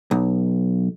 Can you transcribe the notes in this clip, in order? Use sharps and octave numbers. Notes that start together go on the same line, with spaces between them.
B1